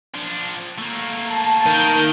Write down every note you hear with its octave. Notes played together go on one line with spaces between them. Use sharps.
F3 D4
A3 A#3
A5
D#3 A#4 G6